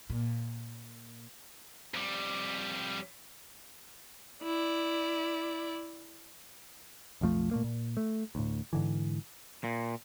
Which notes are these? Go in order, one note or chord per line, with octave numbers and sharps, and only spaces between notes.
A#2
F2 G3
E4 D5
B1 F2 F3 A3
A#2 A3 A#3
A#2
A3
D2 A2
G#2 D3 E3
A#2